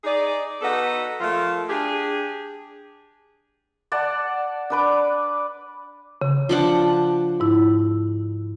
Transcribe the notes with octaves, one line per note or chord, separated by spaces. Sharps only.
D#4 G#4 D5
B3 D#4 F#4 A4 B4 F#5
F3 A3 A#3 F4
D4 G4 G#4
D5 F#5 A5
D4 B4 D6
C#3
F3 D4 F#5
G#2 E4